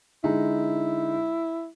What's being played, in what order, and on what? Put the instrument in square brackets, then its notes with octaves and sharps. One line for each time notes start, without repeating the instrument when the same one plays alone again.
[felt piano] D3 G#3 D#4 [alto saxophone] E4